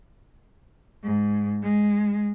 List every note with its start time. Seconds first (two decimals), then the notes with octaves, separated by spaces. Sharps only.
1.04 G#2
1.63 G#3